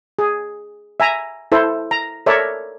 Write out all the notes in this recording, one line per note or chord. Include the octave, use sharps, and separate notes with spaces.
G#4
E5 G#5 A#5
E4 A4 C5
A#5
A4 A#4 C#5 D5 E5